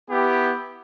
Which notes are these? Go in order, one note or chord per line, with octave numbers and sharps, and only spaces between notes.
B3 E4 G4